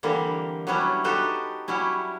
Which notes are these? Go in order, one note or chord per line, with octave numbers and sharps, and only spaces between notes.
D3 E3 G3 A#3 C4
F#3 G3 B3 C#4 D4 E4
D#4 F#4 G4 A4 B4 C5
F#3 G3 C#4 E4